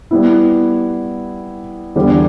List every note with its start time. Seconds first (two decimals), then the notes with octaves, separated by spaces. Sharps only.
0.11 G3 B3 E4
1.96 E2 D3 G3 B3